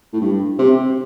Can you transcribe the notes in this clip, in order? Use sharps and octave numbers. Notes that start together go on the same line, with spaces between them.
A2
G2
C3